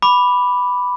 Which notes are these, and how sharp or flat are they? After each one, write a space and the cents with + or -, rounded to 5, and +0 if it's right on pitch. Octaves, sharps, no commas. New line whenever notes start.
B5 +0 D6 +0